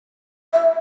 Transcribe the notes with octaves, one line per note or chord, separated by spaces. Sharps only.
E5